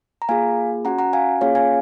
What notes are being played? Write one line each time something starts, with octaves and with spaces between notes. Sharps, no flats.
A#5
A#3 F4 G#4 F5 G#5
C#4 F#4 F#5 A#5
F#5 A#5
F5 G#5
A#3 C#4 F4 G#4 C#5 F5
F5 G#5